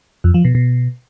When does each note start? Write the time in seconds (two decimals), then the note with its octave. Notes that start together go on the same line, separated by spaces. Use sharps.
0.24 F2
0.34 F3
0.45 B2
0.55 B2